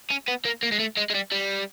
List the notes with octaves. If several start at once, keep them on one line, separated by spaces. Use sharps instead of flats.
C#4
B3
A#3
A#3
G#3
A3
G#3
G#3
G3
G3